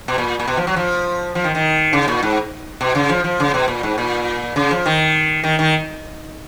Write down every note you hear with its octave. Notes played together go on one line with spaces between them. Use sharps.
B2
A#2
A#2
B2
F3
F#3
F3
F3
D#3
D#3
C#3
A#2
G#2
B2
C#3
F3
F3
C#3
B2
A#2
G#2
A#2
C#3
F3
D#3
D#3
D#3